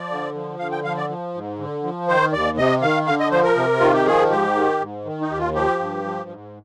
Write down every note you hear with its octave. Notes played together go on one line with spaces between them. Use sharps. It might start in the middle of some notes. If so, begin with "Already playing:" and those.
Already playing: F3 D5
D3
F3
D3 F5
G5
F3 F5
D5
F3
G#2
D3
F3
D#3 C5
D#2 D5
C3 D#5
D#3 F5
D3 F5
D#5
F3 C5
A#4
C3
D#3 F4
G4
F3 G#4
G#2 G4
D#3
G#2
D#3
D#4
D#2 G4
F4
F3 G4
G2
F3
G#2